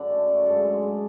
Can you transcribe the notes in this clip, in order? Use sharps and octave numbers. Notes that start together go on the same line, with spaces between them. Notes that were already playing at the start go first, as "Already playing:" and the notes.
Already playing: F#2 D3 A4 B4 D5
A3
F#2
G#2 A4
G#3
G#2